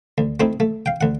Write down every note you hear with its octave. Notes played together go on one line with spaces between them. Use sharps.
D2
A3 C4 D#4 E4
A3
F5 G5
D2 F#5